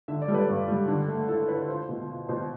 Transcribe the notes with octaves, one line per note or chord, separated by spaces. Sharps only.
D3 E5
D5
G3 A4
B4
G2
G3
D3
A3
E4 A4
E4 B4
F4 C5
B2
F4
B2 C5